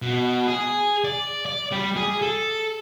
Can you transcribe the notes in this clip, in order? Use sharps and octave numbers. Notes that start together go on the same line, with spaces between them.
B2
G#4
D5
D5
G3
G#4
A4